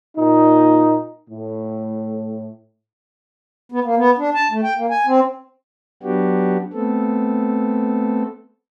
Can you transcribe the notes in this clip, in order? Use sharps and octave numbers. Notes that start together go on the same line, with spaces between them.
A#2 D#4
A2
B3
A#3
B3
D4
A5
A3
G5
A#3
G#5
C4
F#3 B3 D4 F#4 G4
A3 B3 C4 A4